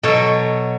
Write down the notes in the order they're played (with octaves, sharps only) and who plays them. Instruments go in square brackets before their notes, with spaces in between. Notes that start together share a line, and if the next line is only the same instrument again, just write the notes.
[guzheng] B2 F#3 A4 C#5